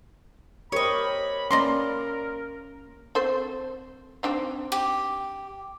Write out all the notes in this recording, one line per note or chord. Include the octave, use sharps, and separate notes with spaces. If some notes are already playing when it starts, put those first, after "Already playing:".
G4 A#4 C5 C#5 D#5 B5
A#3 C#4 A#4 D5 A#5 C6
C4 A4 C5
C4 D4 D#4
G4